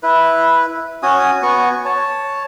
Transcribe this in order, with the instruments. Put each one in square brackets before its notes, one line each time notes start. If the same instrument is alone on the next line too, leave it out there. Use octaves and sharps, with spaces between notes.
[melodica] E4 B4
C#4 F#4 G#5 D#6
B3 F#4 G#5 C#6
C#5 A5